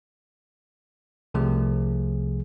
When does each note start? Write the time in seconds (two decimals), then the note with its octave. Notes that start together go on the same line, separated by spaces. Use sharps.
1.34 C2 C3 F3 A3 G#4